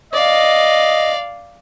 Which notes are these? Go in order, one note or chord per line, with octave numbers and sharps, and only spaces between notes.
D5 D#5 F5